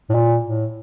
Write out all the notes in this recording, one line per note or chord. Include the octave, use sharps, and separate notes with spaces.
A2
A#2
A2